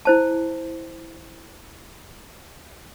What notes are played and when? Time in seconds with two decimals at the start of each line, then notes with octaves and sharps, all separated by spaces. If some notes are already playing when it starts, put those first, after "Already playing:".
0.05 E4 C5 A5